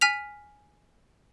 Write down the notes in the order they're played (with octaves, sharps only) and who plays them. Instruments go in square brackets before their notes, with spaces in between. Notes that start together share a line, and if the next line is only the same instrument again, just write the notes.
[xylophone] G#5 F6 B6 F7